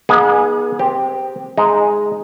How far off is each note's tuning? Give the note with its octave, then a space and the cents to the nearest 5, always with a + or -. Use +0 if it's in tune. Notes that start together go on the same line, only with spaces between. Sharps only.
B3 -45 D#4 +0 G#4 +0
C4 +0 G4 +0
G#3 +0 D#4 -5